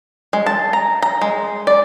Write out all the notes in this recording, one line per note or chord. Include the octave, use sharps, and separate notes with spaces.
G#3
A5
A#5
A#5
G#3
D5